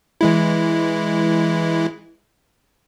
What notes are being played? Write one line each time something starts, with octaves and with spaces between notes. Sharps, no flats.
E3 G#3 E4